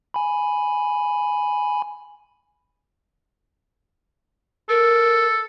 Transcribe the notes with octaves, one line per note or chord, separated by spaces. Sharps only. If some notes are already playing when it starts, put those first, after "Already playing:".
G#5 B5
A4 A#4